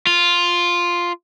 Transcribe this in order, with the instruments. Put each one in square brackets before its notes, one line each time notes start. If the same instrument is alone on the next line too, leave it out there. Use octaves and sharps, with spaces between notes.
[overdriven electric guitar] F4